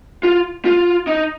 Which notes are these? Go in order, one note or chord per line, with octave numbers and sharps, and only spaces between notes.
F4
F4
D#4